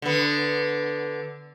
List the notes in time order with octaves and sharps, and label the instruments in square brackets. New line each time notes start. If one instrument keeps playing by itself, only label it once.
[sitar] D3 B3